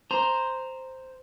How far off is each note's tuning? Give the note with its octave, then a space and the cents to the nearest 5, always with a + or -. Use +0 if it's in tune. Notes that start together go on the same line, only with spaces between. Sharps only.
C5 +0 A#5 +0